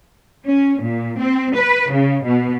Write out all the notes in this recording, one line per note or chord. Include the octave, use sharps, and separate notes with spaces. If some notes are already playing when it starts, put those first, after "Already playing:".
C#4
A#2
C4
B4
C#3
B2